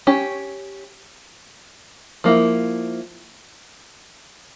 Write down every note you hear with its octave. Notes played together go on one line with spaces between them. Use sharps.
C#4 G4 C#5
F3 A#3 E4